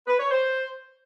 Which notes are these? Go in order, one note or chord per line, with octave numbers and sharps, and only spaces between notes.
B4
C#5
C5